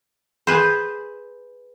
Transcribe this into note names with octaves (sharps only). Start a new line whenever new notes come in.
G#4 B4 C5